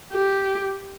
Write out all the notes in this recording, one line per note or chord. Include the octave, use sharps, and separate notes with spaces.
G4